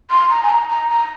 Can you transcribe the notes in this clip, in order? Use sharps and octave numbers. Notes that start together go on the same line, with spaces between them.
C6
A#5
G#5
A#5
A#5
A#5